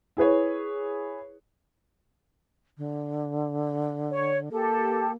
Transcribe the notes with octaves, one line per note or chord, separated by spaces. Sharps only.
E4 G#4 B4 C#5
D3
C#5
A#3 G4 A4